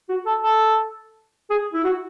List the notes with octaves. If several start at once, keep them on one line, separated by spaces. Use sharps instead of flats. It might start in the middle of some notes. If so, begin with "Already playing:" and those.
F#4
A4
A4
G#4
E4
F#4